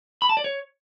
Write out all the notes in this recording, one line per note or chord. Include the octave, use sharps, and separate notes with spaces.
B5
A5
D5
C#5